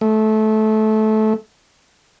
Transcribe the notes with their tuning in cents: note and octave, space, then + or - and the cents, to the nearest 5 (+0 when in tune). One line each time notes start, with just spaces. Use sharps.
A3 -20